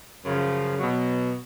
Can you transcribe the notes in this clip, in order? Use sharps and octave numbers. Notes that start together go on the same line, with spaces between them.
F#2 C#3 F3
B2 F#3